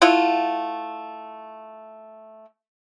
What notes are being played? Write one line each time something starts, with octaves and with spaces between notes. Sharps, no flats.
A3 E4 F4 F#5